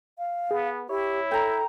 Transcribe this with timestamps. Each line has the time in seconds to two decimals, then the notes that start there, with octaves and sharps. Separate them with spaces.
0.18 F5
0.51 B3 G#4
0.89 E4 G4 C#5
1.31 A4 G5 A#5